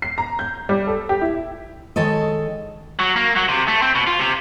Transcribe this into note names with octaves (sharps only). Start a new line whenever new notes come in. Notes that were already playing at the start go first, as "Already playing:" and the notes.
C7
A#5
G6
G3
A4
G4
E4
D#3 G#3 A4 C#5 D#5
F#3
A#3
F#3
C3
A3
C4
B2
F4
C3